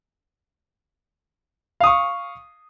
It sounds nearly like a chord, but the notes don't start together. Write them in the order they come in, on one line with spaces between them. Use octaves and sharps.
F5 D#6 C#6